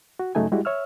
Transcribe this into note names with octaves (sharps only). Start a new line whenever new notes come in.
F#4
G2 C#3 F#3 A3 D#4 G#5
G3 G#3 E4 F#4 G4
C#5 E5 E6 F6